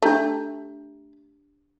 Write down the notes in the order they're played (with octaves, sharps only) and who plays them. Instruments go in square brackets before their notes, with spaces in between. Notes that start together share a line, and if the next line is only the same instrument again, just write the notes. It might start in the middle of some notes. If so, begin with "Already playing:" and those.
[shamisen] A3 [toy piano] D4 G4 A#5